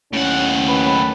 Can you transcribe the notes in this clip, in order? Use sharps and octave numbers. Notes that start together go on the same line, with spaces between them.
D#2 A2 C#4 F#5
B4